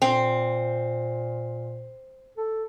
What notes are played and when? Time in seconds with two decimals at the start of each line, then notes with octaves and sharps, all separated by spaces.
0.02 A#2 C4
2.38 A4